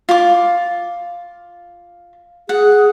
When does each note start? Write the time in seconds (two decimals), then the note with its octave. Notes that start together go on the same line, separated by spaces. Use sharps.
0.09 F4 D6
2.49 G#4 F#5